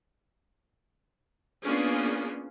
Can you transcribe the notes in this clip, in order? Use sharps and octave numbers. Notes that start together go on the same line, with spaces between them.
A#3 B3 C#4 D4 F4 G#4